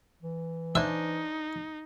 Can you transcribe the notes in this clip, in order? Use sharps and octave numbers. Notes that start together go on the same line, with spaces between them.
E3
D4 D#4 C5 E5 G#5